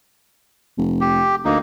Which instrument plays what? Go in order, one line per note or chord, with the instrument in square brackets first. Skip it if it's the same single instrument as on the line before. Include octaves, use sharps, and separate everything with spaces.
[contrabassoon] F1
[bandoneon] G4
[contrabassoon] D2 [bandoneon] A#3 D#4